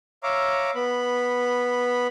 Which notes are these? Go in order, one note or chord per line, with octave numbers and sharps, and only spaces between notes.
C#5 E5 F5 A#5 D6
B3 B5